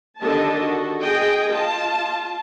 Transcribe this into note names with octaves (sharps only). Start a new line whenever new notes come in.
D3 D#3 G4 A4 D#5 A5
F#4
G#4 D#5 G5
F4 A5